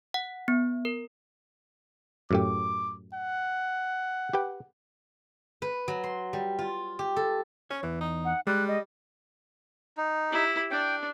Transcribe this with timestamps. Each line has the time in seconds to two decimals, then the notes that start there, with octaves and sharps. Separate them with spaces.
0.14 F#5
0.48 B3
0.85 A#4
2.31 F#2 A2 G4 D6
3.14 F#5
4.33 G4 B4 G5
5.62 B4
5.88 F#3
6.03 C6
6.33 G3
6.59 F4
6.99 G4
7.16 A4
7.71 C#4 C#5
7.83 E2 E3
8.01 D#4
8.25 F#5
8.47 G3 G#3 F#6
8.68 D#5
9.97 D#4
10.30 E4 G4
10.71 D4 G5